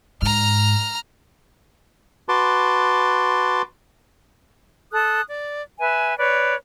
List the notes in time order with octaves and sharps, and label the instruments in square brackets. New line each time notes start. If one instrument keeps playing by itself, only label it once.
[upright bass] G#2 [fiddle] A#5 F6
[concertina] F#4 B4 A5 C6 D6
[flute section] A4 D#6 F#6
D5
B4 E5 G#5
B4 C#5 D5